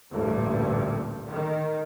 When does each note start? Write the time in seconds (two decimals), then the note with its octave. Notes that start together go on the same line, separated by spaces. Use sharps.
0.12 A1 D2 G2 A#2
1.28 D#3